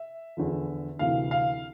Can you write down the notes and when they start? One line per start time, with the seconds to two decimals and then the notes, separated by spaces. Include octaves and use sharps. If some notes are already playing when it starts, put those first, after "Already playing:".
Already playing: E5
0.37 E2 D3 F3
0.99 D2 C3 E3 F5
1.31 F5